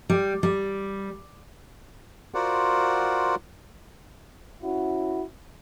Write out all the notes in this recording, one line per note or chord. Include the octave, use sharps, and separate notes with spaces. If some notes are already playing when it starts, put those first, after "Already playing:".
G3
G3
F4 F#4 A#4 C5 D5 F#5
C#4 E4 F#4